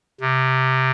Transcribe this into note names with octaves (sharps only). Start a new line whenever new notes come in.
C3